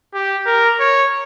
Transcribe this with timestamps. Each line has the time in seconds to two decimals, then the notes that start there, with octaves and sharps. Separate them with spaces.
0.14 G4
0.46 A#4
0.80 C#5